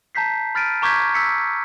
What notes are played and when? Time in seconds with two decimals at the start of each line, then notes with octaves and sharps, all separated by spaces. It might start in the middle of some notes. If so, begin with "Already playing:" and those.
0.15 A5 A#5 G6 B6 C7
0.55 B5 F6 A6 B6 D7 D#7
0.82 A#5 C#6 D6 G6 G#6 B6
1.15 E6 B6 C#7